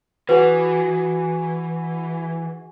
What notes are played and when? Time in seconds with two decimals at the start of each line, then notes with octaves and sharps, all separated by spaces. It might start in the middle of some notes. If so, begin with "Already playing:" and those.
0.29 E3 F#4 G#4 B4 F#5 D6